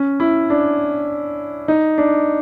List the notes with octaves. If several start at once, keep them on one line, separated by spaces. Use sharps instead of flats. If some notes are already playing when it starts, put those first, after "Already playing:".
Already playing: C#4
E4
D4
D#4
D4